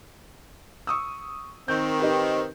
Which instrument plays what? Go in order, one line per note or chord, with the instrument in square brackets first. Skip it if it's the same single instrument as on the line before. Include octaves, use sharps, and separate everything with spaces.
[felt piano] C#6 D#6 E6
[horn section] D#3 C4 [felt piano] G6
[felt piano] D#4 G4 B4